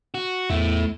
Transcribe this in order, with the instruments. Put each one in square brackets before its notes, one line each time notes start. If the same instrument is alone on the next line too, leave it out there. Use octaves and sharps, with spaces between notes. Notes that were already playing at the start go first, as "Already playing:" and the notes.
[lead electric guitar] F#4
[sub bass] E2 [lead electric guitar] A3 E4